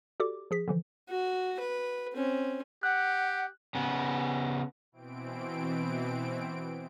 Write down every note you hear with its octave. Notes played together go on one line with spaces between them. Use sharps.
F#4 G4 A4 D5 D6
F3 G#4 B6
D3 E3 F3
F#4
B4
C4 C#4
G4 F#5 F#6
C#3 B3
B2 E3 C4 D7